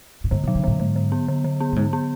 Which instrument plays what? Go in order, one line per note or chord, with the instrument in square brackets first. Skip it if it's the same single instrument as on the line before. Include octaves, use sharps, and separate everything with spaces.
[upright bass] A2
[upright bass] G#2 [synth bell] D3
[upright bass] B2
[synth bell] F#3
[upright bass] C#3
[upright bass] A2 [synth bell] D3
[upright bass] G#2 [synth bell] D3
[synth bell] D3
B3
D3
D3
B3
[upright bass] A2
[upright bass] G#2 [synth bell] D3
[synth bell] B3